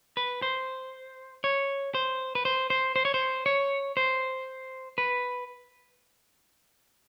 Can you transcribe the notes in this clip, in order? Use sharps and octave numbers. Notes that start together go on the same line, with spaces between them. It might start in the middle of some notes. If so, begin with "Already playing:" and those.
B4
C5
C#5
C5
B4
C5
C5
C5
C#5
C5
C#5
C5
B4